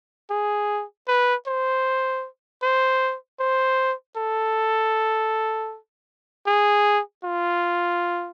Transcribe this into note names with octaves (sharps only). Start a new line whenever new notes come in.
G#4
B4
C5
C5
C5
A4
G#4
F4